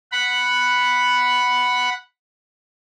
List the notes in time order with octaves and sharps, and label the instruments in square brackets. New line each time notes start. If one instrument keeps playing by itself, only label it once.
[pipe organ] F#5 B5